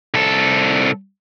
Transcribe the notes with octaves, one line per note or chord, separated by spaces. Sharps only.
C2 A4